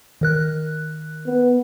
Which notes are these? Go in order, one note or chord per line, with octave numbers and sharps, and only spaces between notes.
D#3 A#4 F#6
B3